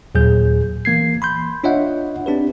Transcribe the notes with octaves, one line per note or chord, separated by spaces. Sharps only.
D#2 A#2 F#3 G#4 G6
E3 A#3 G#6 C7
B5 C6 G6
D4 F4 C#5 D#5 E5 F#5
C4 D4 G4 B4